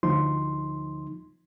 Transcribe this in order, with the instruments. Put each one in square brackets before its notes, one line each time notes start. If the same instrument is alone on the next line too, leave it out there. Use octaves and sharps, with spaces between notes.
[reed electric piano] D2 F3 D#4 C6